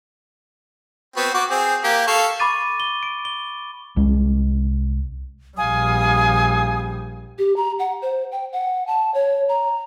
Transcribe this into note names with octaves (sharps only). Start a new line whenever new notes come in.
B3 C4 F#4
F#4 D6
C4 G#4
A#3 G4
A4 F5 C#6
B5 C#6 D6 A6 D#7
G7
D7
G7
C2 G#3 C#4
A#1 G3 F5 G#5 D#6
G4
A#5
F#5
C5
G5
F#5
A5
C#5
A#5